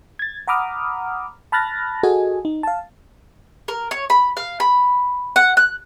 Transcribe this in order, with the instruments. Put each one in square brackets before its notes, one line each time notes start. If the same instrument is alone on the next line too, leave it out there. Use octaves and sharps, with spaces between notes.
[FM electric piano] G#6 A6
F#5 A#5 B5 D6 D#6 F6
A5 B5 F6 F#6 A6 A#6
F#4 G#4 A4 D#5 G#5
D#4
F5 A5
[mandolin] A#4
C#5
B5
F5
B5
F#5
F#6